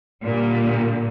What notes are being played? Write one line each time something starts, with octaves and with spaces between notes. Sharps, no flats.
A#2 D3 G3 A#3